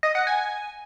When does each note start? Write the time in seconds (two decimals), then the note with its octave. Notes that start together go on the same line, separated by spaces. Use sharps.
0.03 D#5
0.15 F#5
0.27 G#5